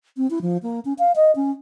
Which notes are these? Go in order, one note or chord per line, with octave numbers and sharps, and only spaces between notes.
C4
E4
F3
A#3
C#4
F5
D#5
C#4